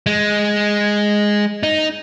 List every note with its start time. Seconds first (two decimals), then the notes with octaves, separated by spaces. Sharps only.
0.06 G#3
1.63 D#4